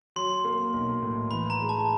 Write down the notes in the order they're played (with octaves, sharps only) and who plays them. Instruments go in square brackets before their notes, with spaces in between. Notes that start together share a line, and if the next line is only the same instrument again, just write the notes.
[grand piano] F#3 [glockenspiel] C6
[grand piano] A#3
B1
A2
[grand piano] E3 [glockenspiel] B5
[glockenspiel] A#5
[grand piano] G#3
[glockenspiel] A5